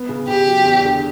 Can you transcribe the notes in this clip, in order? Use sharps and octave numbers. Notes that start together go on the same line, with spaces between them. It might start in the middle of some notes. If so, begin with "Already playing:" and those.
Already playing: B3
C#3
C#3 G4
F#3
E2
D3